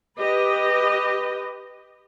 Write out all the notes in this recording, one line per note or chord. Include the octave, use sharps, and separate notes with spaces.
G4 B4 D#5